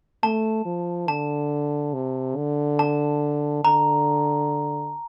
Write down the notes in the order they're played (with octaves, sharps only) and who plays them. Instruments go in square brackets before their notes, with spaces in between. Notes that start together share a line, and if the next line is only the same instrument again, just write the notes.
[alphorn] A3 [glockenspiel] A5
[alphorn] F3
[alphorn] D3 [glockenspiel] A5
[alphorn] C3
D3
[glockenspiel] A5
[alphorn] D3 [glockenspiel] A#5